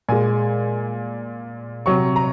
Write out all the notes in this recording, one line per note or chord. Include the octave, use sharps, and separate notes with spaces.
A#2 G#3 G#5
C3 F#3 C#6
A#5